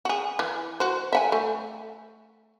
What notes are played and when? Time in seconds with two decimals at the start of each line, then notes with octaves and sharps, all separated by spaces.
0.05 F#4 G#4
0.39 E3
0.80 F#4 C5
1.12 E5 F#5 G#5
1.32 A3